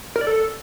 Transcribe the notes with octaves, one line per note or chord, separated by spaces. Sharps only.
A#4
D5
A4